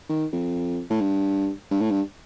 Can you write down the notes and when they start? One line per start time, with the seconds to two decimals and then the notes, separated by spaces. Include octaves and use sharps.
0.09 D#3
0.32 F2
0.90 A2
1.01 G2
1.71 G2
1.81 A2
1.91 G2